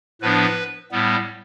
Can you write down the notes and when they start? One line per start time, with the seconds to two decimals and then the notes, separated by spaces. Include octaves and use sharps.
0.21 A2 F3 B3 D4 B4
0.91 A2 G3 B3